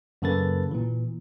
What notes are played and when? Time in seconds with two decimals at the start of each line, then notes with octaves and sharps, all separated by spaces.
0.22 F#2 C#3 A#3 A4 B4 A6
0.71 A#2 E3